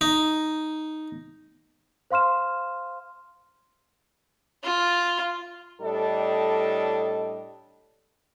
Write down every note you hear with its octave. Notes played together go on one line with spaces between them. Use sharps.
D#4
C5 F5 C6 F6 E7
F4
A2 G3 D4 A4 D#5